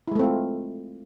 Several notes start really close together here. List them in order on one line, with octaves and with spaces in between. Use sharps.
E4 G#3 A3 C4 F4